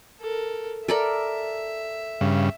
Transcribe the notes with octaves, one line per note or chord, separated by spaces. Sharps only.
A4 A#4
A4 A#4 D5 E5
G2 C#3